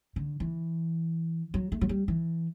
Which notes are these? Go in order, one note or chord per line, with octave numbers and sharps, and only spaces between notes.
D3
E3
F#3
A3
F#3
G3
E3